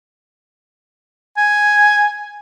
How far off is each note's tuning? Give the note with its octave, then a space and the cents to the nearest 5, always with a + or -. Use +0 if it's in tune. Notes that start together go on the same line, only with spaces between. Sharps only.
G#5 +5